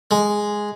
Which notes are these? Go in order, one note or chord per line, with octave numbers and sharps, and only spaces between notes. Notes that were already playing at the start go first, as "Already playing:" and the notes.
G#3